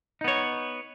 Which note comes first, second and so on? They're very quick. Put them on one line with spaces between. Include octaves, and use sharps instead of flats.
D#4 B3 C#5